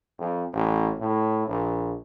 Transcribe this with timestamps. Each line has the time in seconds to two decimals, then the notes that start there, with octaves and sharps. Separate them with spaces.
0.18 F2
0.53 A1
0.98 A2
1.47 A#1